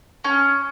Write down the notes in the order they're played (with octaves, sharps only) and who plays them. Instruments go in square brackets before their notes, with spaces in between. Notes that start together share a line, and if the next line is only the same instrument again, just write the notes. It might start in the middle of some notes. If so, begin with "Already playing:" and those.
[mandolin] C#4